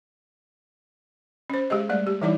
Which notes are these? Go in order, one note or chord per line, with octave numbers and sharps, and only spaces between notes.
C#4 C5
G#3 G4 G#4 D#5
G3 A3 D5
G4
E3 G3 D#4 E4 D5